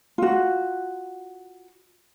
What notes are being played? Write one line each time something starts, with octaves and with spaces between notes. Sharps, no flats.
F4 F#4